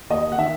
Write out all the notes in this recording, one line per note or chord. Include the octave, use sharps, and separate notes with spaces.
D#2 D#5
F#5
D#3 E5